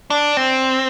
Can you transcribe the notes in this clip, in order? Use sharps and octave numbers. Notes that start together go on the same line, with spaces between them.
D4
C4